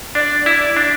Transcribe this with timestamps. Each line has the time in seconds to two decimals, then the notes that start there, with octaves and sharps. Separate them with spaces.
0.15 D4 D5
0.46 E4 D5
0.77 D4